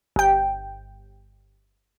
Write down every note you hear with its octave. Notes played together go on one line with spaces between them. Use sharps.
G1 G5